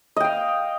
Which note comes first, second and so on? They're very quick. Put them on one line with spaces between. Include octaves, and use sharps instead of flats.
D#5 G5 F5